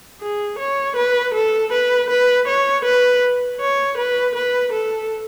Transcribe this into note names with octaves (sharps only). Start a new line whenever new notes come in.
G#4
C#5
B4
A4
B4
B4
C#5
B4
C#5
B4
B4
A4